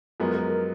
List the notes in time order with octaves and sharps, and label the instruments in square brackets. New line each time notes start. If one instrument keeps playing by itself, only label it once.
[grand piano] F#2 F3 G#3 B3 [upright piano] A#4
[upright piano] A#4
A#4